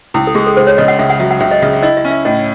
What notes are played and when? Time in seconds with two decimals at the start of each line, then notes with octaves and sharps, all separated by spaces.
0.14 C#2 E4
0.27 A4
0.35 G#3 G#4
0.46 A4
0.57 C#2 C5
0.67 C#5
0.78 C#3 D#5
0.88 F#5
0.99 C#2 E5
1.10 F#5
1.19 F#3 E5
1.31 F#5
1.40 C#2 E5
1.51 D#5
1.62 C#3 E5
1.73 E5
1.83 E4 D#5
1.97 E5
2.05 C#4
2.11 E5
2.25 A2 D#5